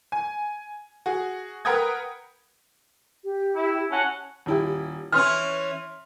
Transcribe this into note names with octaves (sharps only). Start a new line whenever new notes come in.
G#5
F#4 G#4
A#4 B4 F#5 G5 D#6 G#6
G4
E4
C#4 F#5 A5
D#1 E4 G4
E3 C#4 C6 F6